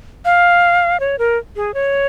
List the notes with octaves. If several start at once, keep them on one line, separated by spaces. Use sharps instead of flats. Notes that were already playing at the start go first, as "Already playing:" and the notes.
F5
C#5
A#4
G#4
C#5